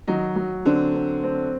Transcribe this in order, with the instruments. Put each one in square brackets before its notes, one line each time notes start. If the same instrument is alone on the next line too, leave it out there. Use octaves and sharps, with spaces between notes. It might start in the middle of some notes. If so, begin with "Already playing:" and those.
[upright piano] D#3 D#4 [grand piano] F#3
[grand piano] F#3
[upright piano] D3 D4 [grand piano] C4
[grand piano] C4
C4